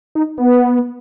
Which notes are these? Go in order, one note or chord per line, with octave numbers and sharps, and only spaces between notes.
D#4
B3